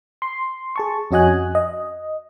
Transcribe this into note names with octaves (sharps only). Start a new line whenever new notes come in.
C6
G#4 A5 C#6
F2 C#4 F#4 D#5 G#5 F#6
D#5